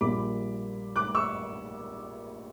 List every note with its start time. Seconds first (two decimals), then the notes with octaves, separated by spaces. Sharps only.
0.01 A#1 A#2 G3 B5 D6
0.96 D6 F#6
1.15 C#6 E6